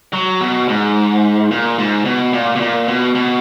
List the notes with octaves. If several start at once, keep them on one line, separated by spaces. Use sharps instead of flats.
F#3
B2
G#2
A#2
G#2
B2
A#2
B2
A#2
B2
B2